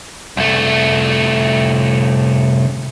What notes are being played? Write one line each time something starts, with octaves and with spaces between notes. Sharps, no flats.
C2 A3